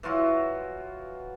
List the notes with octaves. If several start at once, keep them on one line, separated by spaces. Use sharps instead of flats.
E3 F#3 F4 F#4